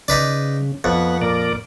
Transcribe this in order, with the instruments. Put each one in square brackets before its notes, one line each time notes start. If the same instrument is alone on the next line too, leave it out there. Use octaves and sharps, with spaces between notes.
[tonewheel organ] C#3 [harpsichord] D#4 B4 D5
[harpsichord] F2 [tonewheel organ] B3 F#5
[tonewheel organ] A#2 A#4 D5